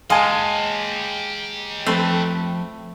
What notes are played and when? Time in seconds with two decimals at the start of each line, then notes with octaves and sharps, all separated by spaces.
0.10 G#3 G4 D#5 F5 G#5 A5
1.86 F2 A3 C4 B4 C6